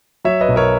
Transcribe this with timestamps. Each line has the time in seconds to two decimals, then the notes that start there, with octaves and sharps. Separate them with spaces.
0.24 F#3 C#5 E5
0.41 B4 D#5
0.49 B1
0.56 A#4 C#5